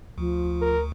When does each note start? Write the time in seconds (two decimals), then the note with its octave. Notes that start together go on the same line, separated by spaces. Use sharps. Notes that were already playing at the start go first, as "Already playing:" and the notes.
0.18 D2 F3
0.61 A#4